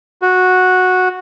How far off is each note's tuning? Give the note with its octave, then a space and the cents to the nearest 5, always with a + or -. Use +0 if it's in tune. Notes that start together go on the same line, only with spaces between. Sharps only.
F#4 -10